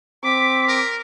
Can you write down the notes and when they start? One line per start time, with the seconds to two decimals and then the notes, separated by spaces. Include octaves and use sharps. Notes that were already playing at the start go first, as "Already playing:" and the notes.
0.24 C4 D6 B6
0.68 A#4